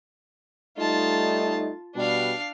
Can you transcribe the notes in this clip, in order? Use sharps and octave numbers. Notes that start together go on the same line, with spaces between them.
G3 A3 D#4 F4 A5
B2 G3 D4 F5